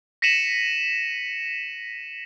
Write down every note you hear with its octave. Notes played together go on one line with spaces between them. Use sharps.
A#6 B6 C#7 D#7 E7 F#7